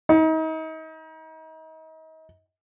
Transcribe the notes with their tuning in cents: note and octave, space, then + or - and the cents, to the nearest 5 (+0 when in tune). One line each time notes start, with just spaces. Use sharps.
D#4 +35